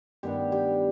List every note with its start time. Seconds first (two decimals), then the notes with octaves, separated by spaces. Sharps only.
0.23 G2 D#3 B3 D4 G4
0.52 G4